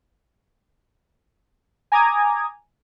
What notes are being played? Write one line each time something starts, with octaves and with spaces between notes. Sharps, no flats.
G#5 A#5 D6 D#6 G#6